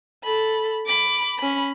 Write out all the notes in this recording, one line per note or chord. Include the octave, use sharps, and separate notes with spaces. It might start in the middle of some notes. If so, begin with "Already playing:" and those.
A4 B5
B5 D6
C#4 B5